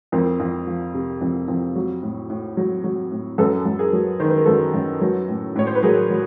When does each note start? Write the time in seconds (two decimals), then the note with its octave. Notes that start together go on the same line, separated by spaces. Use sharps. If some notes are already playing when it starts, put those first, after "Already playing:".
0.12 F2 A#4 C5
0.40 F2
0.67 F3
0.94 C3
1.21 F2
1.48 F2
1.76 F#3
2.03 A2
2.30 A2
2.57 F#3
2.84 F#3
3.11 A2
3.38 F#2 A4 B4
3.65 F#2
3.79 G#4 A#4
3.93 F#3
4.20 D#3 C5
4.28 B4
4.37 A#4
4.45 F#2 A4 B4
4.74 F#2
5.01 F#3
5.28 A2
5.56 A2 C#5
5.67 C5
5.75 B4
5.82 F#3 G#4 A#4
6.10 F#3